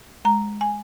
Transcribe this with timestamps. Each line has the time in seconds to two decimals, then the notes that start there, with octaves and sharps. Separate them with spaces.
0.25 G#3 A#5
0.61 G#5